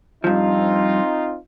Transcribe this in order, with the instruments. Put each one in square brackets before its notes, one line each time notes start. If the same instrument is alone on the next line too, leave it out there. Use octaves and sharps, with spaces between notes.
[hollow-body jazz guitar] G2 F3 [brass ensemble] C4 D#4 F4